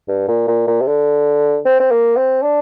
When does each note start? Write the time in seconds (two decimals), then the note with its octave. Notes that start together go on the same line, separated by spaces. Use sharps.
0.08 G2
0.28 A#2
0.48 A#2
0.67 A#2
0.81 C3
0.87 D3
1.65 C4
1.80 C4
1.91 A#3
2.17 C4
2.42 D4